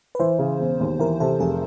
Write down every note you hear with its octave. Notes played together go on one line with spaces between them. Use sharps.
B4
E3 C5
C#3
E1
D#2
E3 A#4
C3 A4
F1 G#4